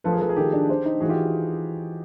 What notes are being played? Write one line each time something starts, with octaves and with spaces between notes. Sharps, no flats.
F3 A4 B4
G#4 A#4
F3 A4 B4
G#4 A#4
D#3 G4 A4
D4
C5
D#4
E3 F#4 G#4
F4 G4